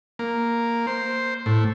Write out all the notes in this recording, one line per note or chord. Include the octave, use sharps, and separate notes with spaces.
A#3
C5
A2